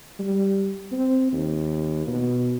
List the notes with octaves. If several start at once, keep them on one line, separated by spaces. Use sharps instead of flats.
G3
C4
D#2
B2